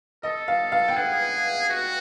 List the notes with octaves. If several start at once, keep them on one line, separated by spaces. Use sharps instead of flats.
A4 D#5
F5
F5
G5
G#4 F#5
F#4